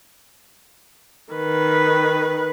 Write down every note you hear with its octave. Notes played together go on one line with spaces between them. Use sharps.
D#3 B4